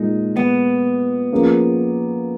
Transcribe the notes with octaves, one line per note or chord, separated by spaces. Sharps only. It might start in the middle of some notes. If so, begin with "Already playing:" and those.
Already playing: A#2 G#3 D#4
B3
F3 A#3 C#4 F4 G#4